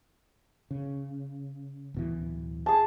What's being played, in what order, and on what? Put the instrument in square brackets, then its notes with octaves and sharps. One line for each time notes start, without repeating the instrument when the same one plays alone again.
[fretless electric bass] C#3
D1 B2 E3
[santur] G#4 A5